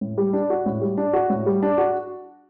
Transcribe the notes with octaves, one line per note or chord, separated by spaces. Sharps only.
A2
G3
D4
F#4
A2
G3
D4
F#4
A2
G3
D4
F#4